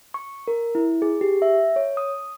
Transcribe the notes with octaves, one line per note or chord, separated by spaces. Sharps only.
C#6
A#4
E4
G#4
G4
E5
C#5
D#6